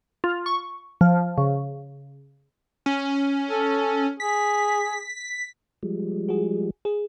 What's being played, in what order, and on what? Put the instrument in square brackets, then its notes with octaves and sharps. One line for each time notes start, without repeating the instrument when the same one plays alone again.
[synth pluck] F4
C#6
F3
C#3
[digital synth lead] C#4
[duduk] A4
[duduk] G#4 [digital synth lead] B6
[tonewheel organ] F3 G3 G#3
[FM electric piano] F#4 G#4
G#4